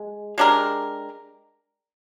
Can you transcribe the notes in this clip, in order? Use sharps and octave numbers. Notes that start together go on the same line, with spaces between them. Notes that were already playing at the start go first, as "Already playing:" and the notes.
Already playing: G#3
G#3 D4 G4 A#4